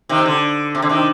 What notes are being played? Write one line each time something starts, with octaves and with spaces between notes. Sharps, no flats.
C3 D#3
D3
C3
D3
C3 D#3